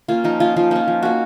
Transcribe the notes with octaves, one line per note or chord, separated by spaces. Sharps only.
A#3 C#4 F4
F3 D#4
A#3 C#4 F4
F3 F4
A#3 C#4 D#4
F3
A#3 C#4 F#4